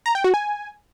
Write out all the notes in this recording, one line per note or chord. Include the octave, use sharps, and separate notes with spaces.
A#5
G5
F#4
G#5